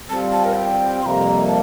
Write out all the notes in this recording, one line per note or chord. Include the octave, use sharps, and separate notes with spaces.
G3 C4 F4 A5
A5
A#4
G5
F2 C3 G3 A#3 A#5 C6
A5